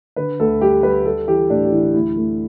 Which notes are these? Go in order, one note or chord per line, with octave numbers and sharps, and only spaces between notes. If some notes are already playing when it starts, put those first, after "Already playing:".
D3 B4
D2 A4
G3 G4
G3 B4
G3 A4
E3 G4
A2 D4
G4
E3 E4
D2 E4
A3